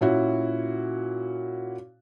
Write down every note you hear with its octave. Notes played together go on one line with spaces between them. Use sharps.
A#2 C#4 E4 F#4